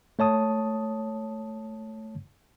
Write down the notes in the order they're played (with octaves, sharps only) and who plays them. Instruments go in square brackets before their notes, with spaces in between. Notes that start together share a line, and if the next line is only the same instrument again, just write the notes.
[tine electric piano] A3 C#5 A5 D#6